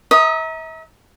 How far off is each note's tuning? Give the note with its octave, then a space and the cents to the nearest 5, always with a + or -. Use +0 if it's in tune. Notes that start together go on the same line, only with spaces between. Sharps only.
E5 -40 A#5 +0 D#6 +0